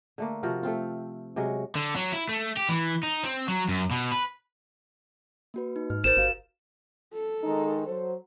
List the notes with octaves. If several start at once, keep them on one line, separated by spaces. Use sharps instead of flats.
D3 A3 A#3
C3 F3 F#4 A#4
A3 C4 F4
C3 F#3 G#3 C#4
D3
F#3
E4
A3
G4
E3
D#4
C4
F#3
F#2
B2
B4
A#3 F#4 B4
D#4
G#2 F6
G#1 G4 A#4 C5 A6 E7
G1 F#4 F5
A4
D#3 G#3 D#4
F#3 C5